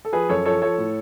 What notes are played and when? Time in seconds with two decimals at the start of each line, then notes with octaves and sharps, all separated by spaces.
0.05 A4
0.12 F3 G#4 B4
0.29 F#2 A4 C#5
0.45 F3 A4 C#5
0.62 F3 A4 C#5
0.78 A2